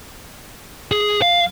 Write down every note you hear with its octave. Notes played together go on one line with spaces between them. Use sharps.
G#4
F5